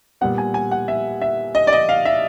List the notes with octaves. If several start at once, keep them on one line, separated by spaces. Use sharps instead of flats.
A#2 G3 B3 F#5
G#5
G#5
F#5
E5
E5
D#5
D5
D#5
F5
E5